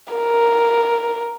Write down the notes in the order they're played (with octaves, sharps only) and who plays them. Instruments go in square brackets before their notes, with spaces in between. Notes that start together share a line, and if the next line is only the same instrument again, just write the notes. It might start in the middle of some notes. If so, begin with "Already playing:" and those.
[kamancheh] A#4